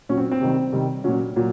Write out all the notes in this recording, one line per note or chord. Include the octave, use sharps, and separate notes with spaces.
A#2 F#3 C#4
C4
C4
C3 D#3 G3
C3 D#3 G3
A#2 F#3 C#4
A#2 F#3